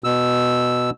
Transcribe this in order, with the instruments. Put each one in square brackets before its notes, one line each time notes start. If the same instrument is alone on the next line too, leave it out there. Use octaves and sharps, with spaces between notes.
[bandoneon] B2 E6